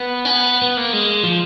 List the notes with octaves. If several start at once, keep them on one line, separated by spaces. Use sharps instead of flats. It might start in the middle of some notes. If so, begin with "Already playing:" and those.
Already playing: B3
C#4
B3
B3
A#3
G#3
F3